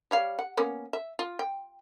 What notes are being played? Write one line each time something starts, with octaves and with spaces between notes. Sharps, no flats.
G3 C#5 F5
F#5
A#3 B3 C#4
E5
F4
G5